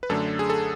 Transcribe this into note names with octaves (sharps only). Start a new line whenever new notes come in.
B4
F#2 D3 A3 D4 A4
G#4
A4